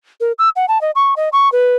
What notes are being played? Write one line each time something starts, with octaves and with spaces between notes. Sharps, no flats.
A#4
E6
F#5
A5
D#5
C#6
D#5
C#6
B4